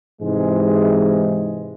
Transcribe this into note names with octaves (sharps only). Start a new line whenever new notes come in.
G#2 C3 E3 G#3